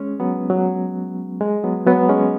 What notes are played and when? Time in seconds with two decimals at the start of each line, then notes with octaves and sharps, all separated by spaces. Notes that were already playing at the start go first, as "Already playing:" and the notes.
Already playing: G#3 C#4
0.20 F#3 B3
0.50 F#3
1.41 G#3
1.64 F#3 B3
1.86 F#3 B3
2.09 G#3 C#4